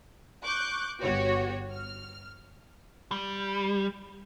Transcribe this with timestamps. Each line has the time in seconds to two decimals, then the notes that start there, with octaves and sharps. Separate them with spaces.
0.43 C#6 D6 F#6 G6
1.02 G1 B3 F#4 G4 C#5
1.71 F6
3.12 G3